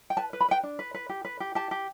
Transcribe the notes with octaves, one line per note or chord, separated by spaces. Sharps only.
G5
B4 A5
B4
B5
B4 G5
D4
B4
B4
G4
B4
G4
G4 A5
G4